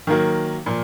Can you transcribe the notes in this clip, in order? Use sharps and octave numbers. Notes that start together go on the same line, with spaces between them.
D#3 F#3 A#3
A#2 F3